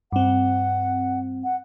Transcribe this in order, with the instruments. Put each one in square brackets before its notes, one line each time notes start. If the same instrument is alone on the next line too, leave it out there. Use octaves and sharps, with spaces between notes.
[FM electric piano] G2 C4 [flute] F#5
[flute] F#5